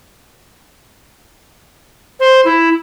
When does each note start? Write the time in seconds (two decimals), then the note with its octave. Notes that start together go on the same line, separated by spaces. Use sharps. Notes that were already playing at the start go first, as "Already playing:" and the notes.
2.20 C5
2.45 E4